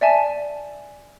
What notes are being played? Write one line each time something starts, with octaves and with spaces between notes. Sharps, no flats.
D5 E5 G#5 A5